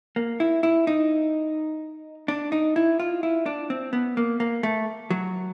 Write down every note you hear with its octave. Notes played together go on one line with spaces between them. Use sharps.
A#3
E4
E4
D#4
D4
D#4
E4
F4
E4
D4
C4
B3
A#3
A#3
A3
F#3